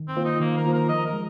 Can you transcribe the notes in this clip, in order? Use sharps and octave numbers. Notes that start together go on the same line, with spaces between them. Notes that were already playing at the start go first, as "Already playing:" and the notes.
Already playing: D#3
C4
A#3 F4 C5
D#4
D#3 A#3
A#4
A#3 F4 C5
A#4
F3 D#5
A#4
G#3